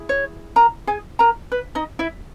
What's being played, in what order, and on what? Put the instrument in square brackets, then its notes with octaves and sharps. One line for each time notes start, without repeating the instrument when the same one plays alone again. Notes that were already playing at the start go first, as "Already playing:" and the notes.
Already playing: [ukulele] E4 G#4
C#5
A#4 A#5
G#4 G#5
A#4 A#5
B4
D#4 D#5
E4 E5